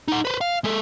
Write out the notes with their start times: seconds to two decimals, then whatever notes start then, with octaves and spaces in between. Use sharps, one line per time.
0.08 D#4 F#5
0.25 B4 C5
0.41 F5
0.64 G#3 A4